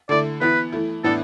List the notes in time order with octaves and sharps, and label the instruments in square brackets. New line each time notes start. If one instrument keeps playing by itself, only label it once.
[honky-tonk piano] D3 A3 E4 [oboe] D5
[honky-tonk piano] E3 B3 E4 [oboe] B4
[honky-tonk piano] E3 A3 E4
[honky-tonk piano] A2 E3 B3 D4 [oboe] A4